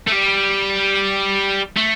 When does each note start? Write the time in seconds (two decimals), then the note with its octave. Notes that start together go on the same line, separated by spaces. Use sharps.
0.07 A3
0.12 G3
1.77 A3